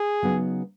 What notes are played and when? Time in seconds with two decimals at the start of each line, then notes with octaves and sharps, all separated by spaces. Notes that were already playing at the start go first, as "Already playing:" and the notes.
Already playing: G#4
0.22 C#3 F#3 B3 D#4 F#4